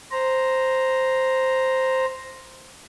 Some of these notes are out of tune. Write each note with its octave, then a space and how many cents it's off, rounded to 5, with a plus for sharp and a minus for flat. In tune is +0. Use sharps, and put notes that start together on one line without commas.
C5 +0 A#5 +0